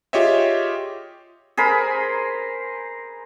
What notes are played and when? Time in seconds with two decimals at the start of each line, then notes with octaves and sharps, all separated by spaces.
0.13 F4 G4 G#4 C#5 D#5 E5
1.57 G#4 A#4 C5 B5